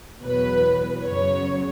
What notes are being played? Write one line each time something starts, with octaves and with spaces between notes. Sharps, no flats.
E2 B2 F#3 B4
F#2 C#3 F#3 C#5